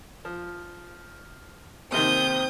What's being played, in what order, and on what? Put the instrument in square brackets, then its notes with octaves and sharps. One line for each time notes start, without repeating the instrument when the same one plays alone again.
[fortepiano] F3
[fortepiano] D#2 C3 D#3 [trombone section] C4 [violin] D#6 G6